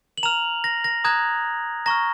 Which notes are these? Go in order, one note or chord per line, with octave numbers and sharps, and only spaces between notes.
F#7
A#5 F6 F7
A#6
A#6
A#5 D#6 F#6 G#6
A#5 C#6 F6 A#6